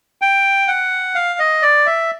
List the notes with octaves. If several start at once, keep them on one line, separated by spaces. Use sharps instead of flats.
G5
F#5
F5
D#5
D5
E5